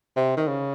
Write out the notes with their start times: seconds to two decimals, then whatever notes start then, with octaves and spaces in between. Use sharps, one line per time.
0.16 C3
0.37 D#3
0.48 C#3